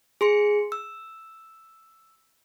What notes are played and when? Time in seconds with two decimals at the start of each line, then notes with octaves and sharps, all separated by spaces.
0.21 G#4 C6 C#7
0.72 E6